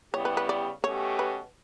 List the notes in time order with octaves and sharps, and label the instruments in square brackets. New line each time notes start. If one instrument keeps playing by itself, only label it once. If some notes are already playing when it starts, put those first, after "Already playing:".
[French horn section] C#3 G3 B3 E4 G4 [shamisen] C#5
[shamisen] B4
B4
D5
[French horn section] B2 A3 C#4 G4 [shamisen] C#5
[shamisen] B4